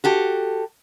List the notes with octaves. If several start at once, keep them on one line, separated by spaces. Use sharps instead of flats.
F#4 G4 A4